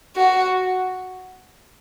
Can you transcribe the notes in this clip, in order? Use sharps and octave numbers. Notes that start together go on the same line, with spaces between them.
F#4